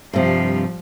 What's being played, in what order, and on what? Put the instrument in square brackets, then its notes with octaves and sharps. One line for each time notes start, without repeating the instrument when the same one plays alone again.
[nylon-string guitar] G2 C3 [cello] F3 G3